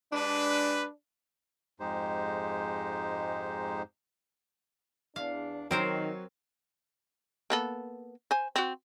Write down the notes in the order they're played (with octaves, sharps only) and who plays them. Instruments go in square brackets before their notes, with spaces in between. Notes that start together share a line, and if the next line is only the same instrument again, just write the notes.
[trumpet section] G#3 G4 B4 [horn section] D4
[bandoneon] F2 G#2 G#3 D#4 G4 C5
[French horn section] E2 D4 [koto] F5
[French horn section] D#3 [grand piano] F#3 C#5 [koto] C4 A#4 C5
[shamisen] A#3 B3 A4
C5 G#5
C4 F#4